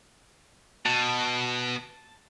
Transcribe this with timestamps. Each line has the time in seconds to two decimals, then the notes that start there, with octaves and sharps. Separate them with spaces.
0.86 B2 A5